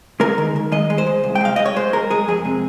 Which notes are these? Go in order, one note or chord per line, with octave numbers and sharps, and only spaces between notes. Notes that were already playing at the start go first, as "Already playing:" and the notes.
G#3 A#4
D#3
D#3
G#3 D#5
G#3
C5
G#3
C2
G5
G#3 F5
G#3 D#5
C#5
G#3 C5
G#3 A#4
G#3 G#4
F2 G#4
C3